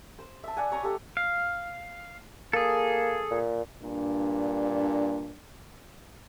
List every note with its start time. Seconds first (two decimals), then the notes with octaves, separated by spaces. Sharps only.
0.19 C5
0.44 E5 A5
0.57 D5 F#5 G#5
0.72 C#5 A#5 C#6 D#6
0.83 G4 A4 F#5
1.17 F5
2.53 A#3 G#4 A4
3.31 A#2
3.83 G2 A#2 D4